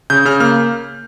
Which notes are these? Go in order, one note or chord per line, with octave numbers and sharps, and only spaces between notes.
C#3 G6
C#3 F6
A#3 F6